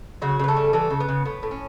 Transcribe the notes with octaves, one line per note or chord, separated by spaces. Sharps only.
C#3 F#3 F#4
C#3 B4
A3 A4
G3
E3 A3 A4
C#3
B3
C#3
A2 B3
A2
C#4